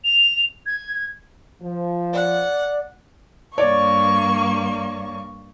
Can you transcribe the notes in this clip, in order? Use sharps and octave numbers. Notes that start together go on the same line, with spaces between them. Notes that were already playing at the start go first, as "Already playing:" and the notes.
F7
G#6
F3
D5 F#5
G2 A#3 C#5 D5 C#6